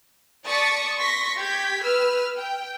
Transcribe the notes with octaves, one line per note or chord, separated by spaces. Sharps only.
D5 A5 C#6 D#6 B6 C#7
C6 C#6 A#6 B6
G4 G6 G#6 B6
B4 E6 F6
G5